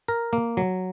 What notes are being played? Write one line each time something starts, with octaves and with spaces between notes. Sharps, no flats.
A#4
A#3
F#3